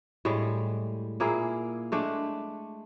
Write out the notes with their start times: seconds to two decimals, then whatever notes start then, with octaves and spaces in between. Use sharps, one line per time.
0.25 A2 G3 G#3
1.20 A#2 A#3 E4 G#4
1.92 G#3 A3 D4